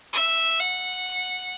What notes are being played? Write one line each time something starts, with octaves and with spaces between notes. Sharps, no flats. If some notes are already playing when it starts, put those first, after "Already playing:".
E5
F#5